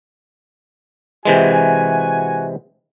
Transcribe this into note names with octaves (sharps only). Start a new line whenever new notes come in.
C3 E3 G#3 F#4 G#5